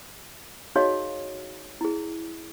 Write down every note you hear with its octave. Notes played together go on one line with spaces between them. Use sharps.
D#4 F#4 G#4 C#5 D#5 F5
E4 G#4